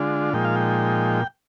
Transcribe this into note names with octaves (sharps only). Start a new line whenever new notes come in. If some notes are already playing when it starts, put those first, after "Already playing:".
Already playing: D3 G#3 D4 F4
A#2 F3 G#3 D#4 G5
F5
G5